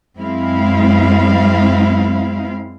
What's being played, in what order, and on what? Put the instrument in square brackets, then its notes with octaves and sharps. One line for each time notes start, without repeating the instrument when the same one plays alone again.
[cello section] F#2 G#3 C4 E4 F5